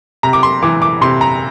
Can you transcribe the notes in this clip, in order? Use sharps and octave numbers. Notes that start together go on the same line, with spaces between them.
C3 A#5
D6
C6
E3 D6
D6
C3 C6
A#5